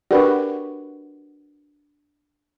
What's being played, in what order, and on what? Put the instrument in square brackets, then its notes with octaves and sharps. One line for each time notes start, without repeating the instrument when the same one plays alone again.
[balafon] D4 A#4 D5 [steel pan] F#4 G4 B4